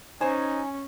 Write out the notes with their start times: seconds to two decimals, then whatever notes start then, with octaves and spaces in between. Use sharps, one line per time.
0.21 C#4 D#4 C5 C#5 G#5